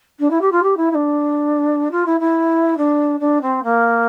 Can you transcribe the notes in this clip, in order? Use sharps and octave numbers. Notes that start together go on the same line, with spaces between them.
D4
E4
G4
F4
G4
E4
E4
D4
F4
E4
E4
D4
D4
C4
A#3